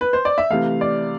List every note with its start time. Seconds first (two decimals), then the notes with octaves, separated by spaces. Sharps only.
0.01 B4
0.13 C5
0.25 D5
0.38 E5
0.50 C3 E3 A3 F5
0.81 D5